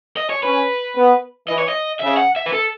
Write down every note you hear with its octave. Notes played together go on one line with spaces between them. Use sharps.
D#5
C#5
C#4 B4
B3
E3 D#5
C#5
D#5
C#3 E5
F#5
E5
B4
A4